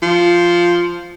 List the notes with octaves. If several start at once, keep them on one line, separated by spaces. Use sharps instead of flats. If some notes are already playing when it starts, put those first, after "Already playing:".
F3